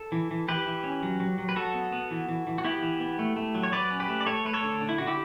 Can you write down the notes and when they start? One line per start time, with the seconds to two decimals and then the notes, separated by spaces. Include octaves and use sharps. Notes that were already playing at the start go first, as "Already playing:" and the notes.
Already playing: A4
0.12 E3
0.31 E3
0.48 E3 G4 B4
0.67 E3
0.84 C#4
1.03 F#3
1.20 F#3
1.38 F#3
1.49 B4
1.56 F#3 F#4 A4
1.74 B3
1.92 B3
2.11 E3
2.29 E3
2.47 E3
2.58 F#4
2.64 B3 E4 G4
2.82 E3
3.00 B3
3.19 A3
3.36 A3
3.55 F#3
3.63 C#5
3.72 F#3 B4 D5
3.90 C#4
4.00 G4 B4
4.09 A3
4.21 D5
4.26 A3 A4 C#5
4.45 A3 B4
4.53 A4 C#5
4.63 D3
4.81 D3
4.89 E4
4.98 D3 F#4
5.07 E4 G4